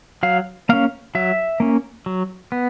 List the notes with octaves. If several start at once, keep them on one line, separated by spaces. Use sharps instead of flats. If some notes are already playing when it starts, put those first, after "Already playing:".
F#3 F5
A#3 C#4 F5
F#3 E5
A#3 C#4
F#3
B3